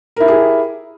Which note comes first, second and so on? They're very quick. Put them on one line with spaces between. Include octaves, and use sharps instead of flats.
A#4 E4 G4 G#4